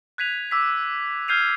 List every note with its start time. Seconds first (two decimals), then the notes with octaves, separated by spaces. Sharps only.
0.18 F#6 G#6 B6 D#7 F7
0.51 D6 E6 B6
1.28 F6 G6 G#6 C7 D#7 F7